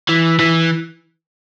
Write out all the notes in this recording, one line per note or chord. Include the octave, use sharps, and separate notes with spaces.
E3
E3